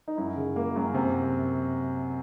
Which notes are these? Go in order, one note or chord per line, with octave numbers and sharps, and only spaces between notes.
D#4
F#2 E4
C#3
A#3
F#2
C3